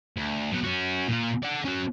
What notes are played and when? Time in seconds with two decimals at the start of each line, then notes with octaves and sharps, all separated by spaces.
0.17 D2
0.52 F#3 B3
0.64 C#4 F#4
1.08 A#2 F4
1.43 D5 F#5
1.65 C#4 F#4